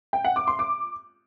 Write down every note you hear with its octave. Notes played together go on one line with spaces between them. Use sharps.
G5
F#5
D6
C6
D6